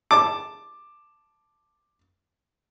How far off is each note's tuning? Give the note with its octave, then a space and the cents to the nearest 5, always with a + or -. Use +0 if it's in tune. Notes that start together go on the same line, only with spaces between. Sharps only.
A5 +0 D6 +10